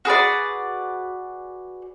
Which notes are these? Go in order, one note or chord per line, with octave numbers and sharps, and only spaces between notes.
F#4 G#4 B4 D5